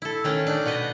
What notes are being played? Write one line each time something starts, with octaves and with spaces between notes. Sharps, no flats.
E4 A4
D#3 A3 C#4
D4 D#4
B2 F#4 B4 D#5